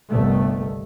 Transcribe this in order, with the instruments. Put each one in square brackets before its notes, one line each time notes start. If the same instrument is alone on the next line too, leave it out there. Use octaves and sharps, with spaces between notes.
[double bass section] G1 C2 G2 D#3 A3